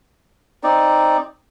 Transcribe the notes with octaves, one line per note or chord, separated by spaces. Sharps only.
C4 D#4 D5